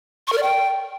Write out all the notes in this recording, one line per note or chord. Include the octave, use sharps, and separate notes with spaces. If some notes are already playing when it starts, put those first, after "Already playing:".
C#6
A#4
D5
G5